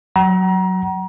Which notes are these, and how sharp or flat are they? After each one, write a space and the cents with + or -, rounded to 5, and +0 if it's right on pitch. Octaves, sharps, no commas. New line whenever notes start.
F#3 +0 F#5 +40 A#5 +30